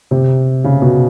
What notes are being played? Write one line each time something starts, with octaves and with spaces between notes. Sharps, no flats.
C3
C#3
B2